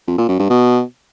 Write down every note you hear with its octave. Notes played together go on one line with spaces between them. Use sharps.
F2
A#2
F#2
G2
B2